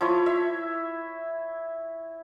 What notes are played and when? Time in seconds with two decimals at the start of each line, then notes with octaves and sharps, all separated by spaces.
0.01 F3 E4 C#5
0.26 E5